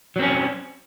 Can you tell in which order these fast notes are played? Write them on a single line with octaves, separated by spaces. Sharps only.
F#3 C4 C#4